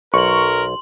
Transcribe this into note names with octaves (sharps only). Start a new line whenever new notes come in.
B1 A#4 C6 C#6 F#7